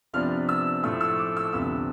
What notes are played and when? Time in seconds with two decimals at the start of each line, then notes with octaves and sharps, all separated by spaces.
0.13 C3 F3 B3 D4 F6
0.49 E6
0.83 A2 F3 A3 E6
1.01 E6
1.19 D6
1.37 E6
1.53 D2 C3 F3 B3 E6